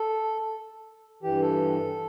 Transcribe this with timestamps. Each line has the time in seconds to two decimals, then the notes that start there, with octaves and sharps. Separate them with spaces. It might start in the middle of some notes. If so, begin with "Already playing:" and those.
Already playing: A4
1.23 G2 E3 G4
1.42 A4